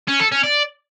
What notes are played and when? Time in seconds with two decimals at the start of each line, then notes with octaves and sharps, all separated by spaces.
0.08 C#4
0.20 A4
0.32 C#4
0.44 D5